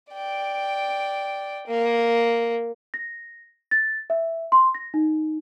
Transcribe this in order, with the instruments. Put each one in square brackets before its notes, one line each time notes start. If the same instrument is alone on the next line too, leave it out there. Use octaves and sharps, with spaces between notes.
[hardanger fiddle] D5 G5
A#3
[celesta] A#6
A6
E5
C6
A#6
D#4